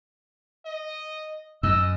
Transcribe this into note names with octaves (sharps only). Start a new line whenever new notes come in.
D#5
F#2 D#5 E6